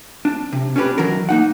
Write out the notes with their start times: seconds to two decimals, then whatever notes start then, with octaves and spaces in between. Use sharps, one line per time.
0.25 D4
0.53 C3
0.76 C#4 D4 G4 B4
0.98 D#3 E3 F#3 D4 A#4
1.29 A#3 D#4 F#5